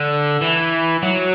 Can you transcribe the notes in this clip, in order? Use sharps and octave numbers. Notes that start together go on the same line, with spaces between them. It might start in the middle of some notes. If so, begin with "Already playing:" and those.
Already playing: D3
E3
F#3